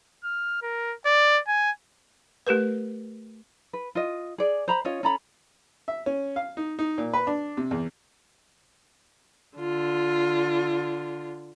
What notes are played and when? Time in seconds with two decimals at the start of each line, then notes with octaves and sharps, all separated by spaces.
0.24 F6
0.63 A#4
1.06 D5
1.48 G#5
2.47 A3 G4 A#4 B4
3.73 B4
3.95 F4 D#5
4.38 G#4 D5
4.68 C5 A#5 B5
4.85 C#4 F4 C#5 D#5
5.03 C#4 A4 A#5 B5
5.88 E5
6.06 C#4
6.36 F5
6.57 D#4
6.79 D#4
6.98 A#2
7.13 B4
7.27 D4
7.57 C3
7.71 E2
9.58 D3 F4